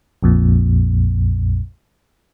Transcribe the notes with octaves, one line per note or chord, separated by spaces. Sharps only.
A#1 F2 A#2